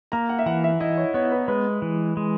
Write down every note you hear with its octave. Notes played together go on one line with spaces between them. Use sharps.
A#3 A#5
F#5
E5
E3 F#5
E5
E4 D#5
C#5
B3 C#5
B4
G#3 B4
E3
G#3